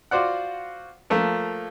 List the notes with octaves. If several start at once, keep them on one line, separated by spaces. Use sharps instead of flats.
F4 F#4 C5 D5 F#5
F3 A3 A#3 F4